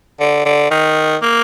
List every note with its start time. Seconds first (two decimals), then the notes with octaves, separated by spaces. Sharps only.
0.20 D3
0.46 D3
0.71 D#3
1.22 A#3